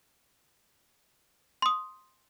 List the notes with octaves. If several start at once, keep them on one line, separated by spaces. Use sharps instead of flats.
C6 D#6